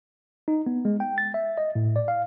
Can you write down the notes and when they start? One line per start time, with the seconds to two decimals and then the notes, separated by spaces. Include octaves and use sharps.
0.48 D#4
0.66 B3
0.85 G#3
1.00 G5
1.18 A6
1.34 E5
1.58 D#5
1.75 A2
1.96 D5
2.08 F5